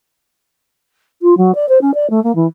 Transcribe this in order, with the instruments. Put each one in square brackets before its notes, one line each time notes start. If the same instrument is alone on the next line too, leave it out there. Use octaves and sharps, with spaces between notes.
[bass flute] F4
F#3
D5
C5
C#4
D5
A3
A#3
E3